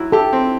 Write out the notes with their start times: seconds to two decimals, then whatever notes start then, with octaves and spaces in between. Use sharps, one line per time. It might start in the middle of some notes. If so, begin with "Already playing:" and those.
Already playing: F#3 E4
0.12 G4 A4
0.33 C4